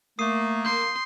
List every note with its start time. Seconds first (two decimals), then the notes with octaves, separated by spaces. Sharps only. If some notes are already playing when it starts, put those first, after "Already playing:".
0.19 A3 A#3 D#6 C7 D#7
0.65 C6 G6